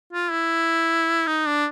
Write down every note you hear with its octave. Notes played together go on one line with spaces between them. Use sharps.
F4
E4
D#4
D4